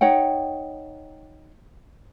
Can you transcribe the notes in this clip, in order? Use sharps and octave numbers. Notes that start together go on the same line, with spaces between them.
D#4 C#5 F#5 G5